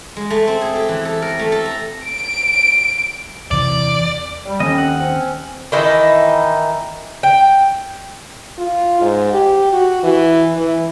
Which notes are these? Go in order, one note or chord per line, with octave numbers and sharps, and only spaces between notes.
G#3
A3
C4
G#4
G4
E3
A4
A#4
A3
A4
A#5
D7
E2 C3 E3 D5
G3
D#2 D3 C4 C#4 D#5
F#5
C4 C#4
D#3 E3 D#4 E4
G5
F4
G#2
G4
F#4
E3
E3